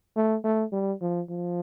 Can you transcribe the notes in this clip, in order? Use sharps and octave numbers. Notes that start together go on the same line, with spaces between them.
A3
A3
G3
F3
F3